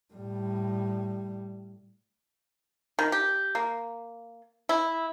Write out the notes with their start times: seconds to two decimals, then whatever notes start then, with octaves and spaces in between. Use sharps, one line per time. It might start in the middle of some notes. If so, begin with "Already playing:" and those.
0.14 A2 G3
2.99 D#3
3.12 G4
3.55 A#3
4.69 E4